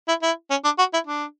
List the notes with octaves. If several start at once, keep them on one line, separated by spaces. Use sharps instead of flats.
E4
E4
C#4
D4
F#4
E4
D4